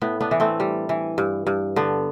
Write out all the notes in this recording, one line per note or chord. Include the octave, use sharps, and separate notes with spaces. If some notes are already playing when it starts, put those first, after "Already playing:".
A2 B3
B3 D4
E3
A3 C4
G3
E3
G2
G2
D3 B3